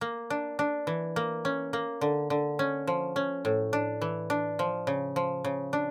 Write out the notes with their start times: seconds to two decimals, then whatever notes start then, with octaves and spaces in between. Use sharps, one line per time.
0.01 A#3
0.30 D4
0.59 D4
0.87 E3
1.16 A#3
1.45 C#4
1.73 A#3
2.01 D3
2.30 D3
2.59 C#4
2.87 F3
3.16 C#4
3.45 A2
3.73 D4
4.02 E3
4.30 D4
4.59 F3
4.87 C#3
5.16 F3
5.45 C#3
5.73 D4